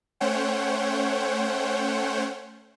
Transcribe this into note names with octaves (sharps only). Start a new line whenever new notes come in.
A3 C#4 C5 C#5 F#5 G5